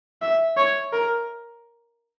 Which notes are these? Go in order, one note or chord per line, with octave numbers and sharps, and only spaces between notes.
E5
C#5
A#4